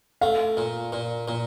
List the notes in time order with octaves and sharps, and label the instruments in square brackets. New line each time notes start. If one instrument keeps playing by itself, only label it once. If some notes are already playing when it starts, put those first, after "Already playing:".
[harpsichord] A3 [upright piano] F5
[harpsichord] A#2
A#2
A#2